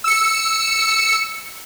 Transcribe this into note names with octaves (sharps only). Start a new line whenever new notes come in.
E6 C#7